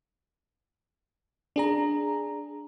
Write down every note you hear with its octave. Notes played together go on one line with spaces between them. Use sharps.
D4 G#4 A#5